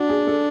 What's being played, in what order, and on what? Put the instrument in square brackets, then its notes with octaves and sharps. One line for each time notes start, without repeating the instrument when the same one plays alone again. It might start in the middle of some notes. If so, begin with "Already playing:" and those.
Already playing: [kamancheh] D4 [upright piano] F#4
[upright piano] G#4
A4